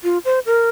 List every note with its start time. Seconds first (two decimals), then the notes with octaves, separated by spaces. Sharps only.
0.04 F4
0.25 C5
0.46 A#4